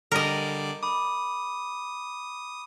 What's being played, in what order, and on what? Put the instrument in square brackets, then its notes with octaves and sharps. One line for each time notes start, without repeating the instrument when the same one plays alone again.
[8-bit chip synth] D3 G3 D5 [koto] A#4 D#5
[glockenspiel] B5 D6 [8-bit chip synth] D#6